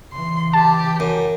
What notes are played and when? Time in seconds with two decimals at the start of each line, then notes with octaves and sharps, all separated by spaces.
0.13 C#3 E3 C6
0.53 G4 A5
1.00 F#2